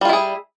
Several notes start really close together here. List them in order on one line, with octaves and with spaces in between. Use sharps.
G3 F4 E4 G#4